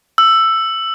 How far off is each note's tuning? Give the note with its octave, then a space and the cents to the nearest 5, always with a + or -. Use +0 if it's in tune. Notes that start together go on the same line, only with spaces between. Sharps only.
E6 +10